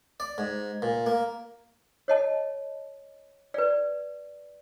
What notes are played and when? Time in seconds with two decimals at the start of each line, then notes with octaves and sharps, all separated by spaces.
0.20 D5
0.38 G#2
0.82 A#2
1.06 A#3
2.08 C#5 D#5 A5
3.54 B4 D5